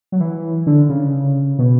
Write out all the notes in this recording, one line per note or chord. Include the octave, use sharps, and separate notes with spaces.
F#3
E3
D3
C#3
B2